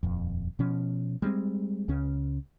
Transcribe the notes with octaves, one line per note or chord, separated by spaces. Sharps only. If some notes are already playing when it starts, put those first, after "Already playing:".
D#1 F2
B2 F3 C#4
G3 G#3 B3 C4
C#2 C#3 C#4